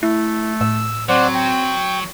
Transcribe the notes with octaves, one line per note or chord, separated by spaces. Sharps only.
A3 E4
A2 E6
F#3 C4 C5 D5 F#5
G5